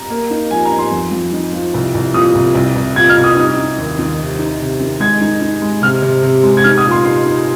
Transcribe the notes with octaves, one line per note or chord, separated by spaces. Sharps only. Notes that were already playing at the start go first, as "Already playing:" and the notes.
Already playing: A#5
A#3
D#4
F3 G#5
A#5
D#4
C6
F2
F2
D#4
F3
C2
C2
A#2 D#6
C2
C2
C2
A#2 G#6
F6
C2
D#6
D#4 D#6
D#4
D#2
D#2
C3
D#4
C3
D#3
G#3 G#6
D#4
D#4
G#3
C3 F6
C3
C3
G#3
G#6
D#4 F6
D#6
A#2
C6
D#4 C6
D#4